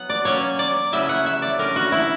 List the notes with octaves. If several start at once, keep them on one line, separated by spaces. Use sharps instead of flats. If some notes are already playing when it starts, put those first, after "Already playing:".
Already playing: F#3 B3 F#5
D5
F#3 A#3 C#4 C#5
D5
C#3 F#3 C#4 E4 E5
F#5
E5
D5
D3 G3 C#4 A#4
F#4
E4